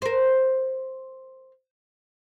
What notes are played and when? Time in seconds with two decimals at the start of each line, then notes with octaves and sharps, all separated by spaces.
0.02 A#4 C5